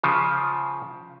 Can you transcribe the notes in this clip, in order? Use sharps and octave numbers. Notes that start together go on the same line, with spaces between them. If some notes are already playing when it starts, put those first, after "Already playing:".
C#3 F3